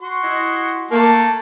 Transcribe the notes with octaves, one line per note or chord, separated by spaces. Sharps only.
F#4 C6
E4 D#5
A3 A#3 A5